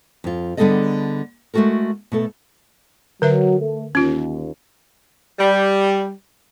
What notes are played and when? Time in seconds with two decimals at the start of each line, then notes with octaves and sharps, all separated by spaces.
0.24 F2 F4
0.57 D3 G3 B3 G#4 A4 D#5
1.54 G#3 A3 C#4 F#4 A4 A#4
2.12 B2 A3 A4
3.22 D3 F#3 B4 E5
3.59 A3
3.95 D#2 C#4 F4
5.39 G3